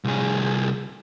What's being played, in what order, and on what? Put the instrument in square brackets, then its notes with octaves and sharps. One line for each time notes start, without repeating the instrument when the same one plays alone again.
[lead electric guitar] C2 G#4